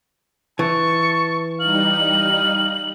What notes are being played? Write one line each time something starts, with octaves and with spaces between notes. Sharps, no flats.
E3 A5 C#6
G3 D#4 F5 F#7